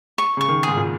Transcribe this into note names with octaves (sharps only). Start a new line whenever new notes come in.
C#6
C#3 C#6
D#3
G#2 G#4
A#2